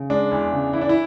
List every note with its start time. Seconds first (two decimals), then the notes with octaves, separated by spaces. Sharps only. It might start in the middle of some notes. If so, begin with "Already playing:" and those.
Already playing: C#3
0.10 G#3 D4
0.31 E2
0.52 C#3
0.73 E3 E4
0.81 D4
0.89 E4